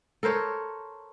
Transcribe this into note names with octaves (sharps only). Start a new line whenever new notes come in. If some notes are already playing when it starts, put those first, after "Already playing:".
A4 A#4 C5 C#5